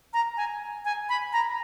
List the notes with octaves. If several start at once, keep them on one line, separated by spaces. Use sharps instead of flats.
A#5
G#5
G#5
B5
A#5